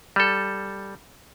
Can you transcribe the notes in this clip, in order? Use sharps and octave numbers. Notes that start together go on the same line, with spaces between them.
G3 A4